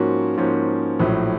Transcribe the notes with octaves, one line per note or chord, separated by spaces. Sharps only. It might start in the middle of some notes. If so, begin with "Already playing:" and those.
Already playing: G#2 F3 A#3 C#4 F#4
G#2 F3 A#3 C#4 F#4
A#1 A2 F#3